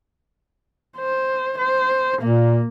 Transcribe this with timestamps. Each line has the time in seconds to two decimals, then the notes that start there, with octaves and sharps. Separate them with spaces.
0.97 C5
1.58 C5
2.21 A#2 A#3